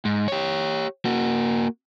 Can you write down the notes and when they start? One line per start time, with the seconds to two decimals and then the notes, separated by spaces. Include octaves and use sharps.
0.05 G#2
0.28 G4 C#5
1.05 A#3 F#4